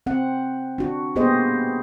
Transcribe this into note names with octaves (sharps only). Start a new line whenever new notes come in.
C4 F#5
D4 F#4
A#3 B3 G4 G#4 C5 D#5